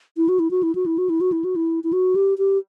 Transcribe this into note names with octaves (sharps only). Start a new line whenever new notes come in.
E4
F#4
E4
F#4
E4
F#4
E4
F#4
E4
F#4
E4
F#4
E4
E4
F#4
G4
G4